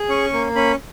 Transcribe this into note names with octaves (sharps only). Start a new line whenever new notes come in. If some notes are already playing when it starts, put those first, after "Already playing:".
Already playing: G#4
C#4 C#6
A#3
C#4 B5